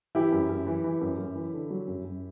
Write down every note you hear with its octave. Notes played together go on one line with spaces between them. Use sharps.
E3 E4 G4
F#2
F#2
E3
E3
F#2
F#2
E3
D3
F#3
F#2
F#2